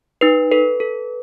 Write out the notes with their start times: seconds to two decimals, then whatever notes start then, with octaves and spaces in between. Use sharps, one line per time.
0.21 D#4 B4
0.51 A4 B4
0.80 A4